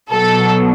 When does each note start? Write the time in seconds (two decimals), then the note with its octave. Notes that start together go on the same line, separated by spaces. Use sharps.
0.11 B2 F#3 A4